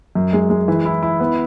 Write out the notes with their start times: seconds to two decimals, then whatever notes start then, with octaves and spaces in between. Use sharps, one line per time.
0.15 F#2
0.33 G#3
0.50 G#3
0.68 E3
0.86 E4
1.03 E4
1.20 B3